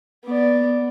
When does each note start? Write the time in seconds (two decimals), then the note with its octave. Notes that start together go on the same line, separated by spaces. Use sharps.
0.24 B3 D5